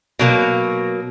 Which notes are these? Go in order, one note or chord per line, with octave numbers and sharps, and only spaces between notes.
B2 F#3 A#3